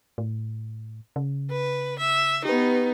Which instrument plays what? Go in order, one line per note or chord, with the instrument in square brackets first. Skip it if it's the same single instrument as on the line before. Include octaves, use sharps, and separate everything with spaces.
[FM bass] A2
C#3
[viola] B4
E5
[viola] B3 D#4 [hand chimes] G4 B4